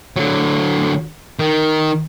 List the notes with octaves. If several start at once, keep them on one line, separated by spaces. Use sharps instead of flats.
D3 F#3
D#3